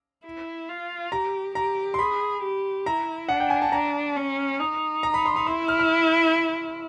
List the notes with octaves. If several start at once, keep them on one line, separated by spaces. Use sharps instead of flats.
E4
F4
G4 A#5
G4 A#5
C6
G#4 B5
G4
E4 A#5
D4 F#5
G5
G#5
A5
D4 A#5
C#4
D#4
A#5
B5
C6
B5
E4 C6
F6
F6